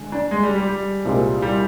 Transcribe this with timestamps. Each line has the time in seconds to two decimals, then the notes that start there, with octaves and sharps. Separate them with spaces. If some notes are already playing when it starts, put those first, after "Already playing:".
Already playing: D3 G#3
0.12 D4
0.31 G#3
0.43 G3
0.56 G3
0.68 G3
1.05 C2 A#2 G#3 C4 G4
1.42 G3